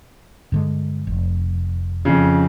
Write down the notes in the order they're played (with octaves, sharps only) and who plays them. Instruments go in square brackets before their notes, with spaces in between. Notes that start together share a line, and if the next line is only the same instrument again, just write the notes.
[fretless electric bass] G2 D3 G#3
F1
[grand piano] F2 C#3